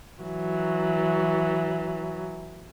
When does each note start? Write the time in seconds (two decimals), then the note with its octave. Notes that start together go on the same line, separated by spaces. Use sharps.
0.22 E3 F#3